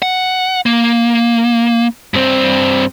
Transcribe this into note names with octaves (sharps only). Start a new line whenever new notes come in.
F#5
A#3
G2 C4